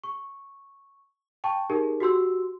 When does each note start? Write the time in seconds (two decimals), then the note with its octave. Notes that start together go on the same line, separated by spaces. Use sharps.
0.04 C#6
1.44 G5 A5 C#6
1.70 D#4 G4 G#4 A#4
2.00 F#4 G4 C6 E6